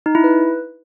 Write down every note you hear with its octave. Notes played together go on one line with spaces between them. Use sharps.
D#4
E4
B4